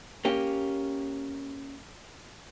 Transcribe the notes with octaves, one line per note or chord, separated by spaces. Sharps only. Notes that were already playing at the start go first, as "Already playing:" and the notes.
A#3 C#4 G4